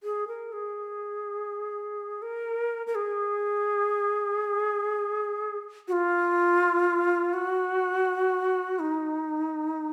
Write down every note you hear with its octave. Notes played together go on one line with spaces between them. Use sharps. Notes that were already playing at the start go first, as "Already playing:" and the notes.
G#4
A#4
G#4
A#4
A#4
G#4
F#4
F4
F#4
D#4